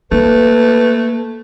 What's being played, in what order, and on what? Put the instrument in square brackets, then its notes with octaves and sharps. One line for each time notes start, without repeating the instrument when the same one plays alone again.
[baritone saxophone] A3 [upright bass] A#3 [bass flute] B4